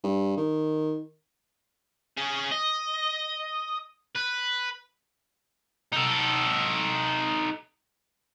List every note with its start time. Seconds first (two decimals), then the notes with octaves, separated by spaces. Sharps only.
0.04 G2
0.37 D#3
2.18 C#4 G#4
2.52 D#5
4.15 B4
5.93 D#4 A4